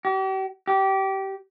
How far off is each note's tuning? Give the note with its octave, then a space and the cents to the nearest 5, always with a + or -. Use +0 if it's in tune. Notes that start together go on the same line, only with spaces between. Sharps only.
G4 -40
G4 -20